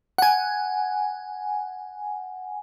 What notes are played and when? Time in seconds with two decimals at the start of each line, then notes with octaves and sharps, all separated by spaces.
0.18 F#5 G#5